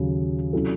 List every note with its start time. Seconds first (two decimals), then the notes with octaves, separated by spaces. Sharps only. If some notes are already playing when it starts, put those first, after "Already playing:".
Already playing: D#2 C#3 F#3
0.53 C3 F#3 C#4 E4 A4